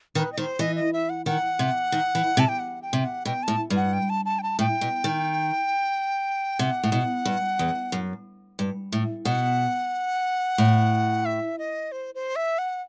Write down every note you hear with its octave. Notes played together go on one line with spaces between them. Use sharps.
D#3 B4
D#5
D#3 C5
E3 D#5
D#5
E5
F#5
D#3 F#5
C3
D#3
E3
C3
A5
G5
F#5
G5
C3
F#5
B2 G5
A2 A5
G2
F#5
G5
A5
A5
G5
A5
A2 G5
B2
D#3
C3 F#5
A2
B2
G2
E2
F#2
G2
A2
B2 F#5
A2
E5
D#5
C5
C5
E5
F#5